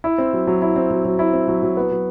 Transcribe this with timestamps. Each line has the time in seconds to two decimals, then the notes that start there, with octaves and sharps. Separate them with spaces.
0.04 E4
0.18 C4
0.33 F#3
0.47 F#3
0.62 E4
0.76 C4
0.91 F#3
1.05 F#3
1.19 E4
1.33 C4
1.48 F#3
1.63 F#3
1.77 B3
1.91 F#3